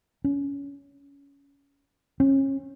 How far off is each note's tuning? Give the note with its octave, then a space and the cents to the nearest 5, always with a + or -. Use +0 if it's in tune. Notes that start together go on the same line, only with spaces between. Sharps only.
C#4 +20
C#4 -30